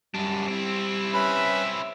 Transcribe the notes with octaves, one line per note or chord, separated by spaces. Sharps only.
F#2 G3 D4
C4 E4
C#4 B4 E5 B5